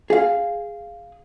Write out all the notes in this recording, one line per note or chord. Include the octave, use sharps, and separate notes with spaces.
G#4 F5